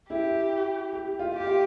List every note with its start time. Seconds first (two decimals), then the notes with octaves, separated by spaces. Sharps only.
0.10 E4 G4
0.93 G4
1.19 F4
1.34 G4
1.47 F4